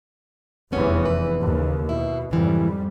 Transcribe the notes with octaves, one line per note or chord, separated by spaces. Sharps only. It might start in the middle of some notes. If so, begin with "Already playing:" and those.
F1 E2 E3 G3 B3 C#4
B4
D#2 C#3
B2 E4
F2 G#2 C#3 E3 G3